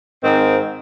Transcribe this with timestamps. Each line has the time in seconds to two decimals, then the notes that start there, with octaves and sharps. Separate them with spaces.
0.24 G#2 D#3 C4